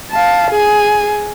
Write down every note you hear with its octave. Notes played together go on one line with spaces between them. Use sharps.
F5 A5
G#4 G#5